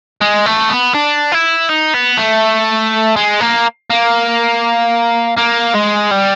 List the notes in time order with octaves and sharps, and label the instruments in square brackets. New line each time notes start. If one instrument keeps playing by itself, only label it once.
[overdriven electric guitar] G#3
A3
B3
D4
E4
D#4
B3
A3
G#3
A#3
A#3
A#3
G#3
G3